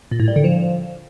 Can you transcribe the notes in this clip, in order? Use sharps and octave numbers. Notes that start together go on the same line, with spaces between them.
A#2
A2
G3
D3
F3